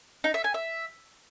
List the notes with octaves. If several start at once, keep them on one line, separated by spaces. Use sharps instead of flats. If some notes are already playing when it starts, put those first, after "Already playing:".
D#4
E5
G#5
E5